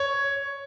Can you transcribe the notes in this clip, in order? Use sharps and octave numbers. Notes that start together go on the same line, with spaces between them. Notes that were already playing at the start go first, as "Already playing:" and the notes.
Already playing: C#5